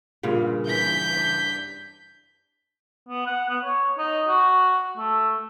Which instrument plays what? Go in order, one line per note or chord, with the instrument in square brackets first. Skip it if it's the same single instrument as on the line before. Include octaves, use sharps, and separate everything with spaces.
[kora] G2 A#2 C#3
[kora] E3 [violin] G6 B6
[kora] D4
[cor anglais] B3
F#5
B3
C#5
D#4
F#4
A3